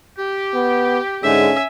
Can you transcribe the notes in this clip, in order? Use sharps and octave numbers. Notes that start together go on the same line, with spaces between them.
G4
B3
G#2 D3 G#3 C#4 E5 G#5